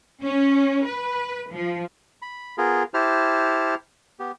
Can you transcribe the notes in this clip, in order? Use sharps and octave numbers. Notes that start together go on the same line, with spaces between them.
C#4
B4
F3
B5
B3 F4 G#4 A#4
E4 G4 C5 A5 F6
B3 G4